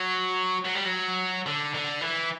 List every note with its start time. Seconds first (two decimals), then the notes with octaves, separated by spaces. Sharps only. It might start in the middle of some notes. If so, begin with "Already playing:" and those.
Already playing: F#3
0.65 F#3
0.75 G3
0.85 F#3
1.46 D3
1.74 D3
2.01 E3